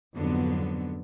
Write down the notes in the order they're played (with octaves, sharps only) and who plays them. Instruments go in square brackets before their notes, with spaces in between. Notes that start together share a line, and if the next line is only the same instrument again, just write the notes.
[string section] F2 G#2 D3 F#3 B3